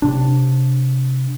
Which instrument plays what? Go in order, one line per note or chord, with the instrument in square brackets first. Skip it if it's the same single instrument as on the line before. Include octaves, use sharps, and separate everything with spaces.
[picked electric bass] C3 D4